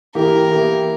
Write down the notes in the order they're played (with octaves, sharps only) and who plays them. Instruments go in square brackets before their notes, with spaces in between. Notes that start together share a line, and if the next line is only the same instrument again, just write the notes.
[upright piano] E3 A#3 E4 G4 [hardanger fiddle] A#4
[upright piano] E3 A#3 E4 G4